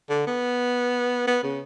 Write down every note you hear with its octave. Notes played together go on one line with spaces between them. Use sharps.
D3
B3
B3
C#3